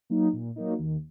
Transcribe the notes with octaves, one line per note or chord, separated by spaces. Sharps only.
F#3 A#3 D#4
A#2
F#3 A#3 D#4
D#2